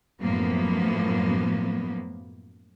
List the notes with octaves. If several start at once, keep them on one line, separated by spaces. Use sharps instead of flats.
F#2 A2 F3 A#3 B3